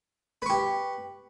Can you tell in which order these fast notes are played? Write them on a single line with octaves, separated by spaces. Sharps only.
B4 C#6 G4